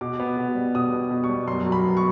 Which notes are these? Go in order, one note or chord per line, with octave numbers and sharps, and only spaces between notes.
B2 D6
B3
B2
G3
B2 D#6
B3
B2
C#6
G3
F#2 C6
F#3
B5
B3
C#6